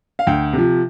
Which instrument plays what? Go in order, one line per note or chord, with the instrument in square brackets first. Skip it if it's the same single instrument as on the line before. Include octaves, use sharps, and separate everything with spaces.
[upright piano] F5
D2 G5
C3 F3